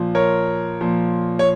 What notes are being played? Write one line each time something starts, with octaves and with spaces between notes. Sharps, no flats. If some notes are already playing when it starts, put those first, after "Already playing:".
Already playing: A#2 F3
A#4 C#5
A#2 F3
C#5